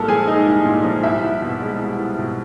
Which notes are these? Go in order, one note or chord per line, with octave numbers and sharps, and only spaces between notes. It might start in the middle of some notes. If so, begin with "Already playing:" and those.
Already playing: C2 A#2 G#3 A4 A#4 A5
F3 G#4 G#5
G#3 D#4 D#5
C2
A#2
F3
C2 E4 E5
C2
B2
G#3
C2
C2
B2